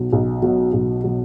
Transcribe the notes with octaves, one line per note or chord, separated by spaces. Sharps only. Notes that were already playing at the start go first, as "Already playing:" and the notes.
Already playing: B1 B2 F#3
B1
B2 F#3
B1
B2 F#3